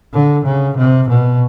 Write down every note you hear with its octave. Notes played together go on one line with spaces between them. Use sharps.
D3
C#3
C3
B2